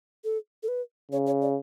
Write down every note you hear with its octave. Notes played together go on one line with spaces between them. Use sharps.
A4
A4
B4
C#3 C#5
C#5
D5